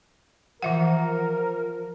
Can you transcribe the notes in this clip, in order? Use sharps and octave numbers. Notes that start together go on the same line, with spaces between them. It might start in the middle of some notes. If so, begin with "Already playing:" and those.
E3 F3 A#4 E5 F#5